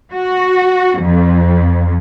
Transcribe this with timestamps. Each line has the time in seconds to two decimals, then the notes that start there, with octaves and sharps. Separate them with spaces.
0.13 F#4
0.99 F2